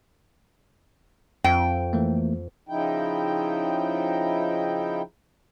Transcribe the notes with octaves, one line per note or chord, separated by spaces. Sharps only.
F2 G5
E3 A3 A#3
C#3 F3 D#4 E4 G5